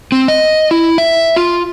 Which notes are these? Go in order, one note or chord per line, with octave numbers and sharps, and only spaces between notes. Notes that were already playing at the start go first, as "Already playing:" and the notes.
C4
D#5
E4
E5
F4